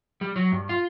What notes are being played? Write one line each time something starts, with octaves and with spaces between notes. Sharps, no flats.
G3
F#3
G2
F4